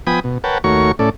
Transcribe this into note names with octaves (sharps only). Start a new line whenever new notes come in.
F3 B3 G5 G#5 B5 D#6
B2
A#4 B4 C#5 F#5 G5 A5
D#2 A3 F#4 A#4 C#5 C#6
A2 C#4 A4 D5